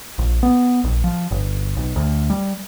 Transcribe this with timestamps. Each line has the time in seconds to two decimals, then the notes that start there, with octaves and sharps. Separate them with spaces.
0.18 A#1
0.43 B3
0.84 A#1
1.04 F3
1.31 G1
1.77 B1
1.96 D2
2.30 G3